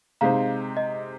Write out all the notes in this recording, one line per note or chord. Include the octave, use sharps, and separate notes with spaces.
C3 G#3 D#4 C5 F5 A#5
D#5